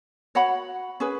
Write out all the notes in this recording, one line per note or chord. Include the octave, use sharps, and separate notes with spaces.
F#4 C#5 F#5 B5
C#4 G#4 B4